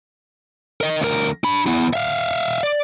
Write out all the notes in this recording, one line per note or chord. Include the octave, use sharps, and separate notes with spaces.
A#4 D#5
D2 A#4
D4 B5
B3 E4
E5 F5
D5